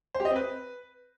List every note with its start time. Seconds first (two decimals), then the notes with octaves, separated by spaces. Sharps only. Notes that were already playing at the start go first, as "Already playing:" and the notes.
0.15 C5
0.20 G4
0.25 D#5
0.30 C4
0.36 B4